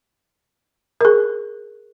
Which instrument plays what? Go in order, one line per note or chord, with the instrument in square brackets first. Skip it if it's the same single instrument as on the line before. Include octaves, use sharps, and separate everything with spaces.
[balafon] G#4 A#4